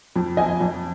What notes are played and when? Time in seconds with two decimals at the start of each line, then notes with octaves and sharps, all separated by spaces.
0.16 F2
0.37 F3 D#5 G#5
0.61 F2